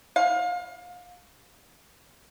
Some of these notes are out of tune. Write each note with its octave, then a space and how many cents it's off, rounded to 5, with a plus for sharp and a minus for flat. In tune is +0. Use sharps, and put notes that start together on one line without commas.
F5 +30